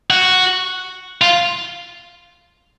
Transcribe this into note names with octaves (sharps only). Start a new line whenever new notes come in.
F#4
F4